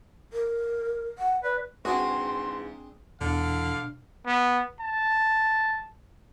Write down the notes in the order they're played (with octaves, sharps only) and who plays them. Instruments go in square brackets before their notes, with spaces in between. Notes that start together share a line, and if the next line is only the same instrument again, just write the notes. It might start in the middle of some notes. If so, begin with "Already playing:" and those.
[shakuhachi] A#4
F#5
[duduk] B4 [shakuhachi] D5
[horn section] G#2 E3 [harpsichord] C4 D4 G#4 [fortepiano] F#4 [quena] C6
[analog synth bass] E2 [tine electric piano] B2 D4 [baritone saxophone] D3 [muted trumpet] F5
[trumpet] B3
A5